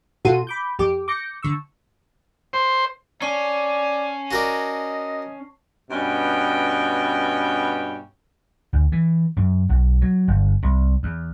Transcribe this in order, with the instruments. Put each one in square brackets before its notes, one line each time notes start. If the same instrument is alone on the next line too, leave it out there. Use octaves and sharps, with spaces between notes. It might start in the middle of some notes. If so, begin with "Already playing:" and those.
[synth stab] B2 F4 F#4 A4 C6 D#7
B5 D6 G6
F2 G4 D6
D6 G6 A#6 C#7
D3 C#6 E6
[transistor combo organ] C5
[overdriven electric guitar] C#4 [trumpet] D5 [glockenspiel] A5 C#6 C7
[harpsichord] F#4 A#4 D5 [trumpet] D#5
[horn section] G2 B2 C#4 G5
[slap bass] D2
E3
F#2
B1
F#3
G1
C2
E2